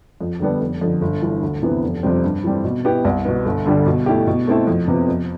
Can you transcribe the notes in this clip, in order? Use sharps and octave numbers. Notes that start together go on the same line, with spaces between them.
F2
D3 G3 B3 D4
F1
F2 D3
G1
G2 E3
D2
C3 E3 B3
F1
F2 C3 G3 C4
G2
E3 G3 C4
B2
B3 E4 G4
C2
B2 B3
G1
G2 D3 G3
B2
A3 E4 G4
B2
A3 C4 E4 A4
F2
C3 F3 B3
F2